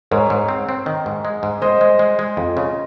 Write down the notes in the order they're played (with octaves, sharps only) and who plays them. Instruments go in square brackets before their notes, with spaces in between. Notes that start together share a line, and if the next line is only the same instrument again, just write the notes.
[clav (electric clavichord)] G#2 [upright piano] A#4 C#5
[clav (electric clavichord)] G#2
C4
C4
D#3
G#2
G#3
G#2
[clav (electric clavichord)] G#3 [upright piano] C5 D#5
[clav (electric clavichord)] G#3
G#3
G#3
F2
C#3